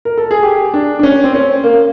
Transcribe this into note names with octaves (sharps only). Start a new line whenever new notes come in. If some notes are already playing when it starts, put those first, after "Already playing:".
A#4
A4
G#4
G4
D4
D4
C#4
C4
C#4
A#3